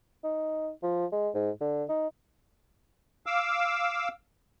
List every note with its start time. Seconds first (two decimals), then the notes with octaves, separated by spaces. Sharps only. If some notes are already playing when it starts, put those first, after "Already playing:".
0.24 D#4
0.83 F3
1.12 G#3
1.35 G#2
1.61 D3
1.89 D#4
3.26 F5 D6 E6